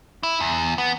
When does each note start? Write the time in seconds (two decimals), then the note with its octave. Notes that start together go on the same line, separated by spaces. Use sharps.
0.23 E4
0.40 E2
0.78 B3